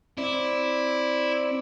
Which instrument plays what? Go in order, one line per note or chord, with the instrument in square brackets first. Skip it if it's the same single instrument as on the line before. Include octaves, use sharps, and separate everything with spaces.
[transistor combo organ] C4 D5 [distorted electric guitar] E4